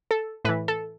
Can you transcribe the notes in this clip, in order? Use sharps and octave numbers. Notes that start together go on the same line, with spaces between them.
A4
A2 E3 B4
A4